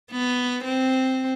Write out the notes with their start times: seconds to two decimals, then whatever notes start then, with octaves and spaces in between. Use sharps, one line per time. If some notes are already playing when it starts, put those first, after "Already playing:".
0.11 B3
0.64 C4